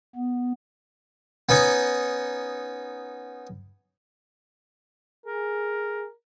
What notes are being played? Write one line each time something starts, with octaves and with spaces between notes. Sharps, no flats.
B3
B3 C#4 D#4
G#4 A#4